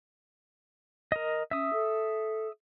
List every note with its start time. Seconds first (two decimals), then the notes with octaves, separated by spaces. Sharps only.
1.12 A#4 D#5
1.51 C#4 E5 D#6
1.73 A4